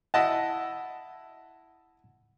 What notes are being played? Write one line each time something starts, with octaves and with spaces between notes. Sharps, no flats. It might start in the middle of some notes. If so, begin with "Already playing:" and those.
E4 D#5 F#5 A5